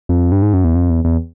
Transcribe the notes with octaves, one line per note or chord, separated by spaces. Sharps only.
F2
G2
G#2
F#2
E2
F2
E2
E2